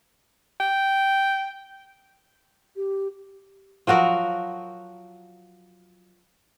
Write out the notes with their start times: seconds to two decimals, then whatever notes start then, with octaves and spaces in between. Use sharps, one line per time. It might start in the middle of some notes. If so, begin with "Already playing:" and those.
0.60 G5
2.76 G4
3.87 F3 F#3 F#4 A#4